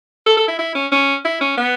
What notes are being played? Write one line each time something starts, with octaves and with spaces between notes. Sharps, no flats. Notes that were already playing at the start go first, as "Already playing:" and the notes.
A4
A4
E4
E4
C#4
C#4
E4
C#4
B3